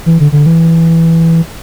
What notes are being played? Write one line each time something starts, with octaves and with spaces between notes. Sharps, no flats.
E3
D3
D3
E3